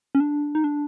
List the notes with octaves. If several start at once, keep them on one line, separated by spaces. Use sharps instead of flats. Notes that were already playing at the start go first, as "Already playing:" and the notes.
C#4
D4
D#4
D4